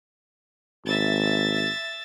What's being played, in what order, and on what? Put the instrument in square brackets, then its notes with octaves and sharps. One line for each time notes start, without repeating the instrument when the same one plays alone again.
[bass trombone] G#1 [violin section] E5 A6